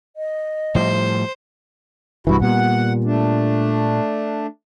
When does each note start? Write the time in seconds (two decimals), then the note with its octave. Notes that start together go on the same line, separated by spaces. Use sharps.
0.16 D#5
0.75 A2 F3 G3 C5
2.27 C2 G2 E3 E4 F#4
2.42 A#2 G3 B3 F#5
3.04 A3 D4